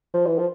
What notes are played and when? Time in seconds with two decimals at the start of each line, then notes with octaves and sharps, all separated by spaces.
0.14 F3
0.26 E3
0.38 F3